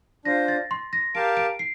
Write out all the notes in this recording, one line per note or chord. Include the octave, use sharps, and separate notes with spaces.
D4 F4 C5 A#6
A6
C6
A#6
G4 A#4 F5 A5 D7
D7
C7